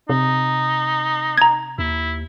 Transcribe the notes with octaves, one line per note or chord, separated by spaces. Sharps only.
C3 D#4
A#5 G#6
D#2 E4